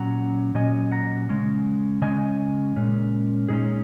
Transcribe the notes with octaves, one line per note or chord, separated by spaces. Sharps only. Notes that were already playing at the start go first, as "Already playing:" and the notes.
Already playing: A#2 F#3 C#4 F#5 A#5
A#2 F#3 C#4 D#5 G#5
F#5 A#5
C#3 G#3 C#4
C#3 G#3 C#4 D#5 G#5
A#2 G#3 C#4
A#2 G#3 C#4 D#4 G#4